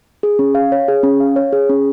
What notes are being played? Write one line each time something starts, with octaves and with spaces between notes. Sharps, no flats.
G#4
C#4
F5
C#5
G#4
C#4
F5
C#5
G#4
C#4